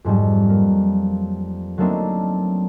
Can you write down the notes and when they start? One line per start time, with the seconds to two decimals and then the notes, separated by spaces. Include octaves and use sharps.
0.04 F2 G#2 F#3 G3
0.49 A#3
1.78 F#3 A3 A#3 C4 D4 D#4